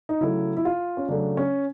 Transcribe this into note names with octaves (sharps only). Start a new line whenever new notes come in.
D#4
C#3 F#3 A3 E4
E4
F4
C#4
C#3 F#3 A3 D4
C#4